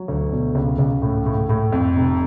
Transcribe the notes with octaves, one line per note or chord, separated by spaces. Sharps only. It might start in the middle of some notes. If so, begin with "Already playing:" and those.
Already playing: F#3
D2
B2
C#2
C#2
A2
A2
A2
F2
F1